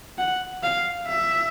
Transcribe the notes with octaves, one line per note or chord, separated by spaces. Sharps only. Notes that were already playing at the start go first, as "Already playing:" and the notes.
F#5
F5
E5